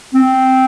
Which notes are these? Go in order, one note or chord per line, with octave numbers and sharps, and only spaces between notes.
C4